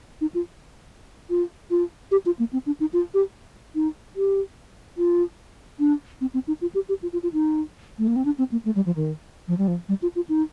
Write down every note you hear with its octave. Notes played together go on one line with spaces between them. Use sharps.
D#4
F4
F4
F4
G4
F4
A#3
C4
D4
D#4
F4
G4
D#4
G4
F4
D4
C4
C4
D#4
F4
G4
G4
F4
F4
F4
D#4
A3
A#3
C4
D4
C4
A#3
A3
G3
F3
D#3
F3
G3
F3
G3
F4
F4
D#4